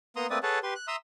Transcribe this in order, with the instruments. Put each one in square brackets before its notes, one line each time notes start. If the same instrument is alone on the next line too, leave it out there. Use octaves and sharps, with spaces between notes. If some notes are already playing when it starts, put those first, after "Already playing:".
[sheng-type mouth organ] A#3 B3 A#5 C6 D#6
A3 A#3 C4 B4 D5 D#6
G#4 A4 B4 C#5 F#5 A5
G4 B4 C6
F#6
E5 A#5 C6 D#6 E6